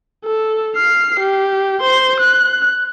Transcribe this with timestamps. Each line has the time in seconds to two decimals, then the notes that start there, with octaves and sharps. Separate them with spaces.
0.25 A4
0.76 F6 C7
1.20 G4
1.81 C5 C6
2.20 F#6